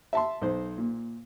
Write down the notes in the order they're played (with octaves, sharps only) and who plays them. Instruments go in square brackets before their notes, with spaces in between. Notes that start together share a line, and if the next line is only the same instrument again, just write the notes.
[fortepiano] E5 A5 C6
B1 C5
A#2